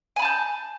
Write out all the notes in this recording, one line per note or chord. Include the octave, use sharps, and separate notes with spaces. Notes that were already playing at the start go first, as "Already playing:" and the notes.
G#5 A5 B5 G6